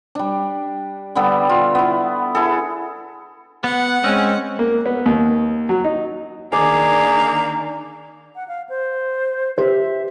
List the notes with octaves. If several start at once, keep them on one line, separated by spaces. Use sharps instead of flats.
G3 D4
D3 G3 B3 A4
F4
B3 E4
E4 G#4 A4
B3 F#5
G#3 C4 C#4
A#3
B3
D#2
F#3
D#4
D#3 A#3 D4 G#4 D5
F#5
F5
C5
G4 C5 E5